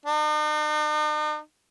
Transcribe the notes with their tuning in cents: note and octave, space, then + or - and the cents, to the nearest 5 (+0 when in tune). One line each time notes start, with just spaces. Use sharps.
D#4 -45